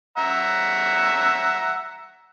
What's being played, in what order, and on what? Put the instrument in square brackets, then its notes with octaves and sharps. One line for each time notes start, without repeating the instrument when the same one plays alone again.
[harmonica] E5 F#5 A#5